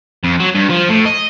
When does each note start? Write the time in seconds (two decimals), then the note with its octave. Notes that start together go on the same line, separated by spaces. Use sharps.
0.24 F2
0.40 F#3
0.54 G2
0.69 F3
0.89 A2
1.06 D#5